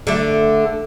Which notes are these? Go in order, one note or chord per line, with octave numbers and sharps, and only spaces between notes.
D3 A3